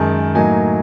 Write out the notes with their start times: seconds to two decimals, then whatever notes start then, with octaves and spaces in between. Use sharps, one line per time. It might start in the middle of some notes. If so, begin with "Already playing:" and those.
Already playing: F#2 D#3 G#3 A5
0.35 A2 F#3 A#3 D#4 G#5